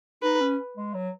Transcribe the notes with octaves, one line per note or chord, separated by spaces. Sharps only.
D#4 B4
C#4
G#3
F#3